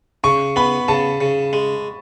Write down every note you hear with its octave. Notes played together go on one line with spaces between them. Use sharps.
C#3 C#6
B3 B5
C#3 A5
C#3
G#3